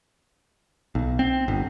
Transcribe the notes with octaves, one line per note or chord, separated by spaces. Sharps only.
B1
C4
G1